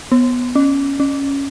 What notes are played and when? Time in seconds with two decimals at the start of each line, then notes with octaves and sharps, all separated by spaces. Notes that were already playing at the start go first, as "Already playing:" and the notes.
0.12 B3
0.56 C#4
1.00 C#4